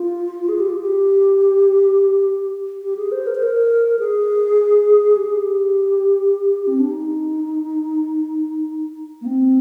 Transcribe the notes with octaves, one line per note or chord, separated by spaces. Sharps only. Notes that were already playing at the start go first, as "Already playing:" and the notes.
Already playing: F4
G#4
G4
F4
G4
G4
G#4
C5
A#4
C5
A#4
G#4
G4
G#4
G4
C4
D4
D#4
A#3
C4